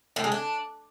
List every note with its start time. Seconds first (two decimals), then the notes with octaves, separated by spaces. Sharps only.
0.16 A2
0.24 G#3
0.32 D4